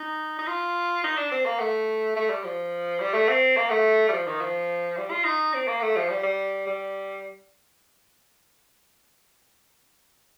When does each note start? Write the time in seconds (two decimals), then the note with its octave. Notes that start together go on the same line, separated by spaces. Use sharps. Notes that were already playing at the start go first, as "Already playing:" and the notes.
Already playing: D#4
0.39 D#4
0.47 F4
1.04 D#4
1.17 D4
1.31 C4
1.45 A#3
1.60 A3
2.16 A3
2.30 G3
2.44 F3
3.00 G3
3.13 A3
3.29 C4
3.57 A#3
3.70 A3
4.08 G3
4.12 F3
4.27 D#3
4.41 F3
4.97 G3
5.10 F4
5.25 D#4
5.54 C4
5.67 A#3
5.81 A3
5.96 F3
6.09 G3
6.23 G3
6.66 G3